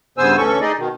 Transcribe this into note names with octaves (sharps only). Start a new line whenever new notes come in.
G2 C#3 B3 C5 G#5 E6
D2 E3 C#4 A4 C#6
D#4 G#4 D5 D#5
B2 D#3